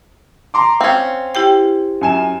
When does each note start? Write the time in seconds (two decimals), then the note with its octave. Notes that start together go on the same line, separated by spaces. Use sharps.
0.54 A#5 C6 D6
0.81 C4 C#4 F5
1.35 E4 G4 G5
2.01 F#2 G#5 E7